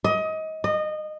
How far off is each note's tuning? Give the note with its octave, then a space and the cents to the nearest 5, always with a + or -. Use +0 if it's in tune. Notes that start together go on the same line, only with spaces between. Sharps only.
D#5 +25
D#5 -20